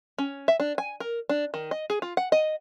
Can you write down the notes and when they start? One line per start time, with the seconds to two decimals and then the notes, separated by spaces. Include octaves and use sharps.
0.18 C#4
0.48 E5
0.60 D4
0.78 G#5
1.00 A#4
1.29 D4
1.54 D#3
1.71 D#5
1.90 G#4
2.02 F4
2.17 F#5
2.32 D#5